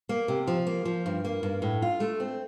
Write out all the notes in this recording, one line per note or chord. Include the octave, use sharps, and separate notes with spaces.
A#3
C3
F3
A#3
F3
G2
A#3
G2
A2
F4
A3
C4